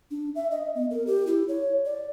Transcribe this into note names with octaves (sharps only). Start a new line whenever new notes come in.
D4
E5
D#5
B3
A#4
G4
E4
C#5
D5